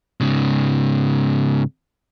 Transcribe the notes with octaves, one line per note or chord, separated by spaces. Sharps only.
G#2 C#3